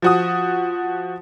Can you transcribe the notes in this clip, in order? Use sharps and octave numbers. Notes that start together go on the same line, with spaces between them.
F3 F#4 D#6